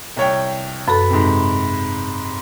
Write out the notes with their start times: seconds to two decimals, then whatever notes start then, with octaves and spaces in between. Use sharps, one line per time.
0.17 C2 C#5 G5
0.88 F#2 F#4 A4 B4 B5
1.10 G#2 C3